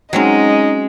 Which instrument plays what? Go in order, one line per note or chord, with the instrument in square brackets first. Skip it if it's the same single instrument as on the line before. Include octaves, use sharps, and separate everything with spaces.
[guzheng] F#3 C4 C#4 [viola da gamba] G#3 [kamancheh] D#4